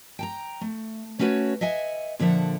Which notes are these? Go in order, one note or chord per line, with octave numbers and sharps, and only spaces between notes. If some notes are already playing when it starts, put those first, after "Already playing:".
G5 A5 A#5
A3
A3 C#4 F#4 B4 C#5
D#5 E5 F#5 G#5
A#2 D3 F3 E5 F#5